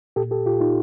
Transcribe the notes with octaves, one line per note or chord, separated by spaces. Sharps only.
A#2 G4 A4
G4 A4
A#2 F4 G4
D#4 F4